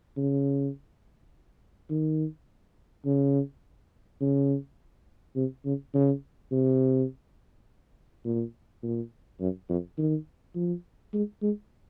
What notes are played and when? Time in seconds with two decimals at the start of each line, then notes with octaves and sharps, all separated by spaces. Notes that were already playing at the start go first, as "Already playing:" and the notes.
0.17 C#3
1.90 D#3
3.05 C#3
4.21 C#3
5.36 C3
5.65 C#3
5.94 C#3
6.52 C3
8.25 A#2
8.83 A#2
9.40 F#2
9.69 F2
9.98 D#3
10.55 F3
11.14 G#3
11.42 G#3